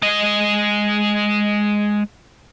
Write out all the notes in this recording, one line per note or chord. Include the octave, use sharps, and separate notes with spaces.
G#3 D#5